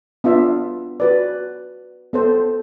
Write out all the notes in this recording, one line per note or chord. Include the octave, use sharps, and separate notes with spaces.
B3 D4 F4 E5
F#4 B4 D5
B3 A4 C5